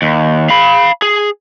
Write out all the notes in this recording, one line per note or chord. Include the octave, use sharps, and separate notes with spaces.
D#2
F5 B5
G#4